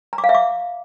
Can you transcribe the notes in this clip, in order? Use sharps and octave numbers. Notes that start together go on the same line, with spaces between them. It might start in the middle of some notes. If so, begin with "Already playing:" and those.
A#5
D6
F5
E5
D6